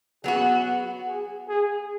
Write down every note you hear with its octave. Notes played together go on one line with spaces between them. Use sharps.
F#3 B3 F#4 G#4
G#4
G#4